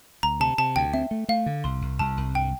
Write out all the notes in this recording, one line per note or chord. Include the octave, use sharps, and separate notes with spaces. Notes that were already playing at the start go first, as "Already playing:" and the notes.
D2 A#5
C3 A5
C3 A5
D2 G5
C4 E5
A3
A3 F5
D3
C2 C6
C2
C2 A5
C2
G2 G5